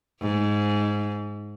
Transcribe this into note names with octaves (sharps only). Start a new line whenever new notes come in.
G#2